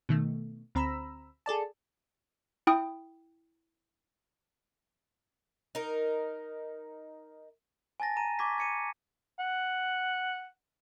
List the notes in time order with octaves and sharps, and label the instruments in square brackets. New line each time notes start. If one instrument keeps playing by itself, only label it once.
[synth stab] B2 D#3 A3
D2 C4 A#5 B5 E6
G#4 A4 D5 A5
[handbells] E4 G5 D#6
[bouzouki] D#4 A#4
[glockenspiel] G#5 A5 A6 A#6
A#5 D#7
C#6 D6 G#6 B6
G#6 C#7 D#7
[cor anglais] F#5